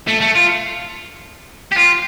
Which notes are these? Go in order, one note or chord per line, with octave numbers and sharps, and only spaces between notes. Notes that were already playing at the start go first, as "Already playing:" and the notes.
A3
A3
F4
G4
F4